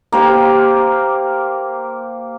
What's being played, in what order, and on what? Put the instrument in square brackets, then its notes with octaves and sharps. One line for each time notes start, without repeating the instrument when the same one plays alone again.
[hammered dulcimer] A#3 G4 C5